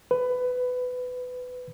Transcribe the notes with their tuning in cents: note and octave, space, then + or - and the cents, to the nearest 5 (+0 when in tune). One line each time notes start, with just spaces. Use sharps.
B4 +20